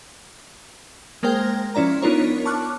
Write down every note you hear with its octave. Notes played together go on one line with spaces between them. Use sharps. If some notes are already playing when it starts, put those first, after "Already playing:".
G#3 A#3 A#4 C5 G5 A#6
F3 C#4 E4 D5 A#5
B3 D4 D#4 F4 A#4 C#5
A5 C#6 D6 F6 F#6